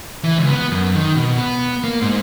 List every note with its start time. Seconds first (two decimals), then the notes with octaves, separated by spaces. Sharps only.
0.24 E3
0.38 C#2
0.50 B3
0.71 F#2
0.96 D#3
1.15 B2
1.38 B3
1.84 A#3
2.01 G#2